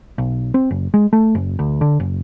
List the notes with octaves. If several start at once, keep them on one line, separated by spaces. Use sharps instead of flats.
B1
C4
F#1
G#3
A3
F#1
D2
D3
F#1